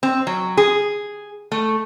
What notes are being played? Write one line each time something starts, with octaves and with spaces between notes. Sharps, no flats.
C4
F#3
G#4
A3